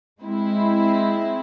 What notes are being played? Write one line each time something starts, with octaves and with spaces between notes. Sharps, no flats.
G#3 C4 E4